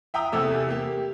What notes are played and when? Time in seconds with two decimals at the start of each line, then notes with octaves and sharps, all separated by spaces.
0.14 E5 G5 A#5 D#6
0.32 E2 C3 A3 E6
0.69 A#3 G4